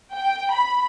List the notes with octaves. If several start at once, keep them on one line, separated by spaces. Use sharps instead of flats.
G5
B5